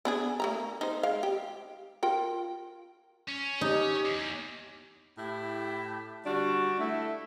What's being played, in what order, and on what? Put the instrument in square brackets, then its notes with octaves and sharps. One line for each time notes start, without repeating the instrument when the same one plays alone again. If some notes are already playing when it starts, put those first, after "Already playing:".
[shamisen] B3 D4 G#4
A3 A#3 A#5
D#4 C5
G#3 F5
G4
F4 A#4 G5
[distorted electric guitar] C#4
[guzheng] D#4 [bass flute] G4
[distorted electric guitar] E2
[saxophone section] A2 E4 G4
[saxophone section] D3 G3 D4 [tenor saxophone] F#4
[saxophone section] A3 [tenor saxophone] E4